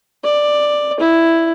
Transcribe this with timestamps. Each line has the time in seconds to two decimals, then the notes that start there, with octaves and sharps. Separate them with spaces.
0.24 D5
1.00 E4